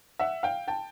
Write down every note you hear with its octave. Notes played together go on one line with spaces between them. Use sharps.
E5 F#5
F5 G5
G5 A5